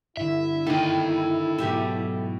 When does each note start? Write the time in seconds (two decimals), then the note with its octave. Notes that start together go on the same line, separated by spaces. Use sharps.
0.17 G2 D3 E4 E5
0.67 D#3 A#3 A4 D#5 G5
1.58 G#2 B2 F#3 A3 G4 E5